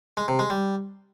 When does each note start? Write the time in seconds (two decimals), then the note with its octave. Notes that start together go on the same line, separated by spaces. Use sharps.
0.17 G#3
0.28 C3
0.39 G#3
0.50 G3